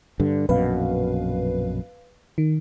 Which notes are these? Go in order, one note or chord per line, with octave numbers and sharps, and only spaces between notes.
G2 D3
A#1 F#2 B2 B4 F5
D#3